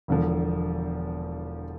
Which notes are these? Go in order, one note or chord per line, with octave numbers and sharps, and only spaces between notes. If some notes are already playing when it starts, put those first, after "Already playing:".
E1 E2 D3 F3